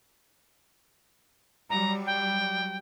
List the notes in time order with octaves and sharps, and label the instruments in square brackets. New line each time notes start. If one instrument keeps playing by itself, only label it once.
[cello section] F#3 G3 [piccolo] A#5
[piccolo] G5